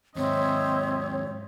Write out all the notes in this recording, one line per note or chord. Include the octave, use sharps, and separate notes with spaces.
D#2 G#2 C4 C#5 D#5 E5